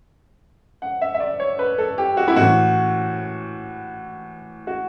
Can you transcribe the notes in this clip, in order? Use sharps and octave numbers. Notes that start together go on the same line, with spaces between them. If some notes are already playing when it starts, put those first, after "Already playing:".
F#5
E5
E5
D5
C#5
B4
A4
G4
F#4
E4
A2 E3 F#4
F#4